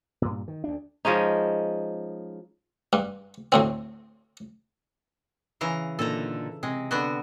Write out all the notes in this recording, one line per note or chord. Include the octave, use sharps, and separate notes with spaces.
G2 A#2
D#3
D2 D4
F3 G#3 C#4 D#4
G2
D2 A2 C4
C#3 E3 A#5
A#2 D3 D#4 A4 A#5
C3 G#3
D3 B3 F#4